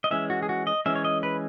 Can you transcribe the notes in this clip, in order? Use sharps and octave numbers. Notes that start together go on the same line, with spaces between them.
D#5
E3 G#3 C#4 E5
F#4
G#4
F#4
D#5
E3 G#3 C#4 E5
C#5
D#5
B4